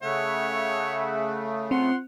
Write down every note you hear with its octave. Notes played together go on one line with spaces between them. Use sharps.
C#3 A3 C#5 E5 F#5
C4 F4 F#5 C6